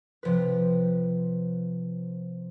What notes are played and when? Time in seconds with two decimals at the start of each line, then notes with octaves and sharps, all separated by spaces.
0.23 C3 F3 B4